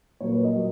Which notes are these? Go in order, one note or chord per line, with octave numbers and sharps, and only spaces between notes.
A#2 F#3 A#3 C#5
B4
D#5
A#2 F#3 A#3